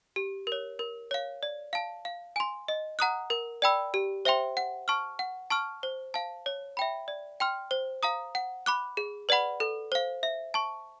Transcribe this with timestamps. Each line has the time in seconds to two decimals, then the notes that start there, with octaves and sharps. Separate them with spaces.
0.16 G4
0.47 A#4 C#5
0.79 A#4
1.11 C#5 F5
1.43 D5
1.73 F5 A5
2.05 F5
2.36 G#5 C6
2.68 D#5
2.99 F#5 A#5 D#6 F#6
3.30 A#4
3.62 D5 G5 B5 E6
3.94 G4
4.25 C5 E5 G5 C6
4.57 F#5
4.88 A5 C#6 F6
5.19 F#5
5.50 A5 C#6 F6
5.83 C5
6.14 F5 A5
6.46 C#5
6.77 E5 G5 B5
7.08 D5
7.40 G5 C6 F6
7.71 C5
8.03 F5 A#5 D#6
8.35 F#5
8.66 B5 D6 F#6
8.97 G#4
9.29 B4 D5 F#5 B5
9.60 A4
9.92 C5 F5
10.23 E5
10.54 A5 C#6